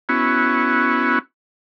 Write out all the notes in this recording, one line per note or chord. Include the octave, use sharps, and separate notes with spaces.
B3 C#4 E4 F#4